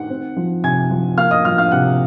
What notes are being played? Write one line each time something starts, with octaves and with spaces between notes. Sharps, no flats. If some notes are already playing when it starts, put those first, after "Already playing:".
Already playing: D#3 F#5 F#6
C4
F3
C3 G#5 G#6
F3
A#3 F5 F6
D#5 D#6
F3 F5 F6
F5 F6
C3 F#5 F#6